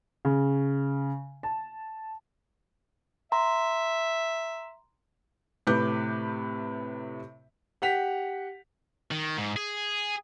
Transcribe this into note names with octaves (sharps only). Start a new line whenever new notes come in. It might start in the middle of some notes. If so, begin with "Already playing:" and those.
C#3
A5
E5 A#5 C6
A2 C3 B4 D6 G6
G4 F#5 B6 F7
D#3
G#2
G#4